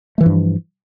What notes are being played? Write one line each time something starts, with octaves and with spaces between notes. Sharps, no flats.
G2 E3 F3 A3